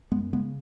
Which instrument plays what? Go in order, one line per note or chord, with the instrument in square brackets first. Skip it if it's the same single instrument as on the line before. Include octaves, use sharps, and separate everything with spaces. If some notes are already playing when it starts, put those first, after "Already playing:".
[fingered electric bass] F#2 G#3 B3
C#3 G#3 B3